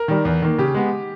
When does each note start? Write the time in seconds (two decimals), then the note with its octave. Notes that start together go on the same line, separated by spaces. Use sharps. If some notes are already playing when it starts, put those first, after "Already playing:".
Already playing: A#4
0.08 D#3 G3
0.25 E2
0.42 D#3 A#3
0.58 C#3 G4
0.74 G#3 B3